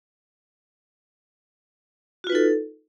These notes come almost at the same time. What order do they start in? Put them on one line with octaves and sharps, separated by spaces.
F#4 F4 B4 D#4 A4